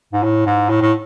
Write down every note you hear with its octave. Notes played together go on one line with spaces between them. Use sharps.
G#2
A2
G#2
A2
A2